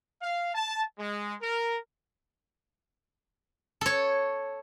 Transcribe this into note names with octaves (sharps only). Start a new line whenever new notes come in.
F5
A5
G#3
A#4
A4 C#5